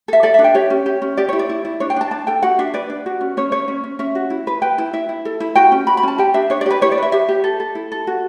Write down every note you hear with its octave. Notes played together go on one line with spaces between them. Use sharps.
A4 E5
A4 D5
E5
D4
G5
G4 C#5
C#4
G4
C#4
G4 D5
E4 C#5
D5
E4
E4
D4 C#5
G5
D4 A5
D4 A5
A4 G5
F#4 F#5
D4 E5
B4 D5
D4
F#4
C#4
C#4 C#5
C#4 C#5
C#4
C#4
C#4 E5
F#4
E4
B4
B4 G5
E4
E4 E5
E4
A4
E4
F#4 G5
C#4
F#4 B5
B5
C#4 A5
G4 G5
D4 E5
D4 C#5
D5
G4 B4
E4 C#5
D5
B4 E5
G4 E5
G4
A4
A4
E4
A4
F#4